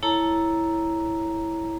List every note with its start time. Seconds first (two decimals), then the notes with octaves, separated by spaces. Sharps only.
0.03 E4 A4 C#5 A5 A#5